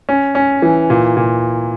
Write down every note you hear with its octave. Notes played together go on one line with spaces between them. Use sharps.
C#4
C#4
E3
A#2
A#2